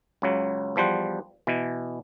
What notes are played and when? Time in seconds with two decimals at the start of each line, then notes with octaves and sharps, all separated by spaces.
0.22 C#2 C#3 F#3
0.76 E2 F3 G3 C5 F#5
1.47 B2 E3